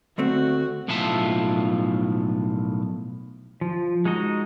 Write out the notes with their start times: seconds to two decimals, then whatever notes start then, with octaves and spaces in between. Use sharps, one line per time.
0.18 D2 A3 C4 F#4
0.88 B1 A2 F3 F4 E5 A5
3.61 F3
4.05 G#3 D#4 F#4 D#5